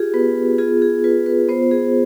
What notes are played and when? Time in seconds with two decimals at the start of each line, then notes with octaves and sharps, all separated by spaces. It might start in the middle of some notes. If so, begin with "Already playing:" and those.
Already playing: F4 G4 G#4
0.14 B3 B4
0.58 F4 G#4
0.82 G#4
1.04 F4 B4
1.26 B4
1.49 B3 C5
1.71 G#4